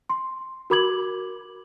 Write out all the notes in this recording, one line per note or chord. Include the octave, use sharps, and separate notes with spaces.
C6
F#4 A#4 B5 D6 G#6 F#7